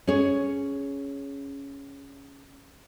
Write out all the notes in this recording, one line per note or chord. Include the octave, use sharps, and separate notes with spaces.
C#4 G#4 C#5